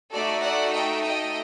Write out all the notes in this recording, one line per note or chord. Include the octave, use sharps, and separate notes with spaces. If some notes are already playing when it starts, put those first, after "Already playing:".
A3 D#4 F#4 A4 D5
D5 F#5
D#5 G5
D#5 G5